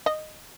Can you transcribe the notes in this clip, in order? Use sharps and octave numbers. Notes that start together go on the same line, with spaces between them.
D#5